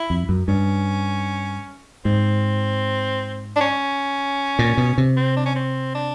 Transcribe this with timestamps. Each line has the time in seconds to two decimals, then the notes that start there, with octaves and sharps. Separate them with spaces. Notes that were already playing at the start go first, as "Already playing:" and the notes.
Already playing: E4
0.10 F2
0.29 F#2
0.48 G2 C#4
2.05 G#2 C4
3.57 D4
3.61 C#4
4.59 A#2
4.77 B2
4.98 C3
5.17 C4
5.37 D4
5.46 C#4
5.56 C4
5.95 D4